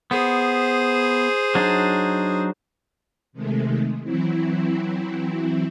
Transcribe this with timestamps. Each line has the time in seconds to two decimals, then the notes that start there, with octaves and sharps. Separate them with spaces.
0.11 B3 G#4 C5
1.55 F#3 D4 D#4
3.33 C3 D#3 G#3 A3
4.03 E3 F#3 C4 E4